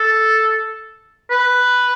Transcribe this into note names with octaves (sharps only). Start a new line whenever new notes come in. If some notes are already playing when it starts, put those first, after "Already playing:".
Already playing: A4
B4